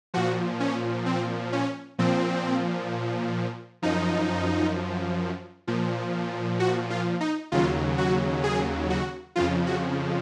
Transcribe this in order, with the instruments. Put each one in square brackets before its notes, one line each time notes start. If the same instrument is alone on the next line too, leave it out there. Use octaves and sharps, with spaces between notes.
[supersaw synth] A#2 F3 F#4
C#4
C4
C#4
A#2 F3 C4
F#2 F3 D#4
A#2 F3
F#4
F4
D#4
D#2 C#3 F#3 F4
F#4
G#4
F#4
F2 C#3 F3 F4
F#4